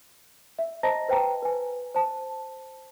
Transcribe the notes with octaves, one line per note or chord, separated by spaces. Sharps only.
E5
C5 D#5 A5 A#5 A#6
B4 C5 G5 A5 A#5
B4 G#5
C5 A5